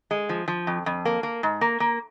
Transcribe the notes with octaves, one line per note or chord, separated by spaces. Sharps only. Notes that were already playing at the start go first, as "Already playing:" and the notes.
G#3
F3
F3
F2
F2
A#3
A#3
G#2
A#3
A#3